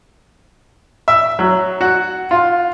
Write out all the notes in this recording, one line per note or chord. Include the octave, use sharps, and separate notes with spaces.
E5
F#3
F#4
F4